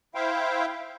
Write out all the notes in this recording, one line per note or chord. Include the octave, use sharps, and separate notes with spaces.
E4 C5 E5 F5 G5